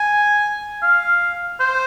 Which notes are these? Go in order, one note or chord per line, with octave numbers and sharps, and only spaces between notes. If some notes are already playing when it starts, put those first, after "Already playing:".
Already playing: G#5
F5
C5